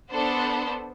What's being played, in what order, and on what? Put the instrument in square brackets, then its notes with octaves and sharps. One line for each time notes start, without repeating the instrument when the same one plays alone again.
[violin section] B3 D4 A4 C5